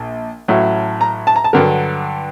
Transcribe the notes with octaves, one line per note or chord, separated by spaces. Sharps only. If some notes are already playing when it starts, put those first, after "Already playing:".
Already playing: A#1
A1 A2 F#3
A#5
A5
A#5
A5
G2 D3 F#3 A#4